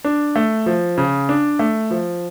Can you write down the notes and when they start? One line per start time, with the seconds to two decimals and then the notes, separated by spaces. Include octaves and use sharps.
0.04 D4
0.36 A3
0.66 F3
0.98 C#3
1.29 D4
1.59 A3
1.91 F3